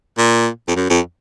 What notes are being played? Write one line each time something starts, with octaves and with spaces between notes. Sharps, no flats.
A#2
F2
F#2
F2